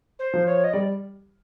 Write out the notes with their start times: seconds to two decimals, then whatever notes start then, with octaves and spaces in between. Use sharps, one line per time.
0.19 C5
0.34 F3
0.46 C#5
0.64 D#5
0.73 G3 D5